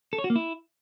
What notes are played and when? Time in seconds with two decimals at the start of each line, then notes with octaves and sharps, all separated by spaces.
0.13 A4
0.18 C#5
0.24 F#4
0.30 A#3
0.36 E4